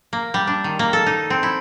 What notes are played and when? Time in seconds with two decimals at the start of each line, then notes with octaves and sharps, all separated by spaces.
0.13 A#3
0.34 G3
0.47 D4
0.64 D#3
0.79 A#3
0.93 A4
1.06 D#4
1.30 C4
1.43 E4